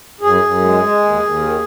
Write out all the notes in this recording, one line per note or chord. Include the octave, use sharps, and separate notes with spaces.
F#2 G#4
F#2
G#3
G#3
D#2
D#2
D#3